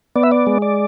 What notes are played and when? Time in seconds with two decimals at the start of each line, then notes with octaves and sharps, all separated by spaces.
0.16 B3 D5
0.23 E5
0.32 D5
0.47 G#3
0.62 D5